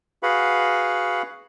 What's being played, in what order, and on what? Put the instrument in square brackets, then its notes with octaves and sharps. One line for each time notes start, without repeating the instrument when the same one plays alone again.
[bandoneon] F#4 G#4 B4 F5 F#5 B5